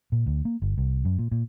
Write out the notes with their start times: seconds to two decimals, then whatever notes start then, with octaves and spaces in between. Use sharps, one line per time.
0.12 A#2
0.26 D2
0.45 A#3
0.62 G1
0.78 C2
1.05 F#2
1.19 A#2
1.32 A#2